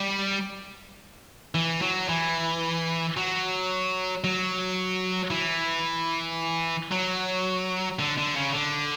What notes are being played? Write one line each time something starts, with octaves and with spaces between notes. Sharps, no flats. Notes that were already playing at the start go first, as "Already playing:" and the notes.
Already playing: G3
E3
F#3
E3
F#3
F#3
E3
F#3
D3
D3
C#3
D3